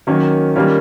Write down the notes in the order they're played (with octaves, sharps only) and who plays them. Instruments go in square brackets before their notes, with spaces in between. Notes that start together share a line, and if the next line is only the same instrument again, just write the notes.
[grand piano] D#3 F#3 A#3 C#4
D#3 G3 A#3 C#4 F4